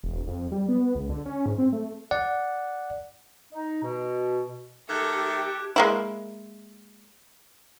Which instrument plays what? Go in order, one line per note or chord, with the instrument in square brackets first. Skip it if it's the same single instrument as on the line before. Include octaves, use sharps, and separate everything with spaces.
[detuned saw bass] E1
F2
G3
B3
C#2
D3
C#4
G#2
C4
A3
[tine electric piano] D5 F#5
[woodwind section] D#4
B2
[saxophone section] D#3 A3 [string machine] G4 [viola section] A4 [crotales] D6 F#6 G#6
[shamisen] G#3 A#3 E4